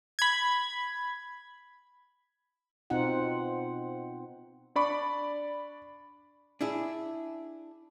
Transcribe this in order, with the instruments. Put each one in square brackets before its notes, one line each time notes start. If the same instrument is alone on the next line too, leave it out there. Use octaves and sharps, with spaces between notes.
[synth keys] B5 G#6
[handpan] B2 C4 D#4 F4 F#5
[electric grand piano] D4 D5 B5 C#6 D6
[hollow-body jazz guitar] D4 E4 G#4